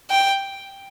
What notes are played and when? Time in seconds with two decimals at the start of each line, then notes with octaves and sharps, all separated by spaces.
0.10 G5